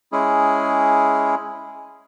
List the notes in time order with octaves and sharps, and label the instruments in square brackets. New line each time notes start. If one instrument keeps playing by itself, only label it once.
[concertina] G#3 C#4 E4 G#4